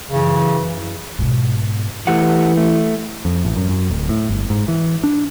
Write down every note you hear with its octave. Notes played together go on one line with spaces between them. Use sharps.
F#2 C#3 E3
G#2 B2
E3 A3 G4 F#5
A3
F2
A1
F#2
F#2
D1
A2
G1
G#2
E3
D4